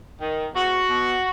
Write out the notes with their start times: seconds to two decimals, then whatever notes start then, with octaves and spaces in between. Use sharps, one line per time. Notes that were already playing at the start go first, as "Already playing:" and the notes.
0.21 D#3
0.54 E2 F#4
0.88 B2